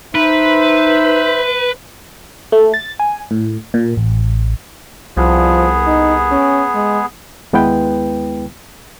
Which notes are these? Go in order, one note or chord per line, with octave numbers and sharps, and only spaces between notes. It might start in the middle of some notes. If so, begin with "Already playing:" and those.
D#4 B4 C5 E5
A3
A6
G#5
A2
A#2
A1
C2 F3 B3 G#4
D#4
C#4
G#3
D#2 G#3 B3 E4 B4 G5